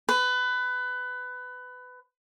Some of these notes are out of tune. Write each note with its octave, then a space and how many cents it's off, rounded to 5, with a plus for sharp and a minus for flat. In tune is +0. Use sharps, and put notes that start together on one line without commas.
B4 +20